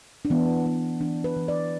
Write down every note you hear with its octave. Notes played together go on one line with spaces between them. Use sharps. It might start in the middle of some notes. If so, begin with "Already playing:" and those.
D4
E3 B3
B3
E3 D4
B4
E3
D5